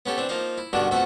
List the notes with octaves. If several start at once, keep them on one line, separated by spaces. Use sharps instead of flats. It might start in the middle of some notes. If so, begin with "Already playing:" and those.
B3 C#4 G4 A4
E3 C4 D4
F3 A#3 D#4 F5
E4
G2 B2 D3 D#3 D4 F#4
F2 B2 A3 F#4 E5 F#5